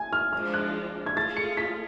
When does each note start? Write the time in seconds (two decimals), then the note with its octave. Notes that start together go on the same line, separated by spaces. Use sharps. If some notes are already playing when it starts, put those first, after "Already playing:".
Already playing: G#5
0.13 F6
0.33 F3 G#3 D4 F4 F6
0.54 F#6
1.06 G#6
1.16 A3 F4 G#4 A6
1.37 C#7
1.57 B6